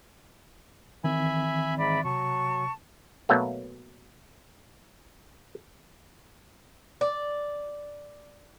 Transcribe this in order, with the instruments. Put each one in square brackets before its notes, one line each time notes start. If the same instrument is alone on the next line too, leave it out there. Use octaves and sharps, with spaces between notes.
[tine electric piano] D#3 E3 C4 [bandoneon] E5 G#5 B5
[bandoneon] G#2 [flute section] D5 E5 B5
[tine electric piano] C3 [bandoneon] F#3 [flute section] A5 C#6
[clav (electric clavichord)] B2 F#3 A3 A#3
[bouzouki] D5